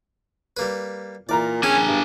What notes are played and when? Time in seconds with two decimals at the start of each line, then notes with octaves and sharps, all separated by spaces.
0.57 G3 A#3 B4
1.29 A#2 E3 A#4 D5 A#5
1.63 C#4 D4 G#4 G#5
1.87 G2